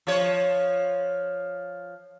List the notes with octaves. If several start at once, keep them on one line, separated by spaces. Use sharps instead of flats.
F3 C#5